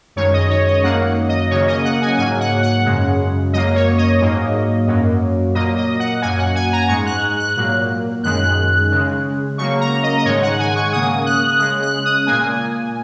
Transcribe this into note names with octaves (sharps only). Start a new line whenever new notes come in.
F#2 D#3 G#3 C#5
D#5
C#5
D#5
F#2 D#3 F#3 A#3 F#5
D#5
C#3 F#3 A#3 C#5
D#5
F#5
G#5
G#2 F#3 A#3 G#5
F#5
F#5
F#2 C#3 G#3
F#2 F#3 A#3 D#5
C#5
D#5
G#2 F#3 A#3
F#2 F#3 A#3
A#2 F#3 A#3 D#5
D#5
F#5
F#2 F#3 A#3 G#5
F#5
G#5
A#5
G#2 G#3 C#6
F#6
F#6
A#2 F#3 A#3
F#2 D#3 G#3 F#6
C#3 G#3
C#3 F#3 A#3 C#6
A#5
D#5
D#5
G#2 D#3 G#3 C#5
F#5
G#5
C#6
C#3 A#3 D#6
F#6
C#3 G#3 F#6
F#6
D#6
A#2 A#3 G#5